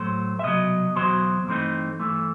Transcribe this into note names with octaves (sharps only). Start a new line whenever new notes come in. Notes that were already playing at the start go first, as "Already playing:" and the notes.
Already playing: A2 F#3 A3 C5
E5
C2 B2 F#3 D#5
E2 B2 F#3 C5
G2 E3 A3 C4 D#4
G2 E3 A3